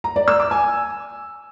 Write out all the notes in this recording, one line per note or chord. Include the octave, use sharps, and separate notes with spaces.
A#5
D5
E6
D6
G#5